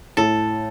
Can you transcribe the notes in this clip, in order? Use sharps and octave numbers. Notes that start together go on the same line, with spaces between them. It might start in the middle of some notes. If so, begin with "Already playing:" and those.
A2 A4